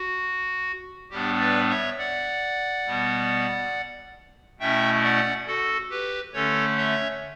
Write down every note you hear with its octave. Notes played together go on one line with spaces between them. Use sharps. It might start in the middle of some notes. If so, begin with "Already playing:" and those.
Already playing: F#4
A2 G3 B3 D4 G4
B4 D5
C#5 E5
D5 F#5
B2 G3 B3
B2 A3 C#4 E4 E5 G5
D5 F#5
F#4 A4
G4 B4
D3 A3 C#4 A4 C#5
C#5 E5